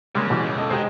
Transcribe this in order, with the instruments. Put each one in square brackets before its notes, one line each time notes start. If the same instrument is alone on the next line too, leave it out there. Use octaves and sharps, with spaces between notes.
[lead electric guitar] C#3 [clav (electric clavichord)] G3 G#3 A#3
[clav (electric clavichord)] B2 E3 G3
[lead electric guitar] C#2
[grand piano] A4 D#5
[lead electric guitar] D#3 D#4 [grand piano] G#3 G4 [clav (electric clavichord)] C5